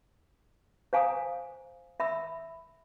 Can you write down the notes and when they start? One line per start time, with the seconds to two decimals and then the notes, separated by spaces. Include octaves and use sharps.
0.93 C5 F5 G#5 A#5 D#6
2.00 E5 B5 E6